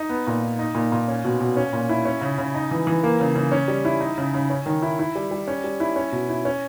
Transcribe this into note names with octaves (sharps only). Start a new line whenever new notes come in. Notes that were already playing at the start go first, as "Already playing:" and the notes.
Already playing: D#4
B3
A#2
D#4
D#4
A#2
A#2
C#4
B2
B2
C#4
A#2
E4
C#4
C#3
C#3
D#4
E3
E3
A#3
C#3
C#3
C#4
G3
E4
D#4
C#3
C#3
C#4
D#3
E4
E4
G3
G3
C#4
G3
E4
C#4
B2
E4
C#4